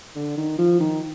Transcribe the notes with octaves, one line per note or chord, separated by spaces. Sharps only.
D3
D#3
F3
D#3